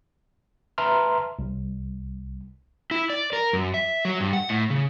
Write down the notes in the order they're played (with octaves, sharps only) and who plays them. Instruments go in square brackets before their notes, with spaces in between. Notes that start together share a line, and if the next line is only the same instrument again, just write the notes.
[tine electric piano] B4 E5 A5 A#5 C6 F6
C2
[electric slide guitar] E4
D5
A#4
F#2
E5
F#3
G2
F#5
A2
C#3